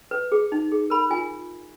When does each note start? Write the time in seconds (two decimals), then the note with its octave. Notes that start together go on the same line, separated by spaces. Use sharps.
0.11 B4
0.32 G#4
0.52 D#4
0.72 G#4
0.90 A#4 B5
1.10 F4 G#5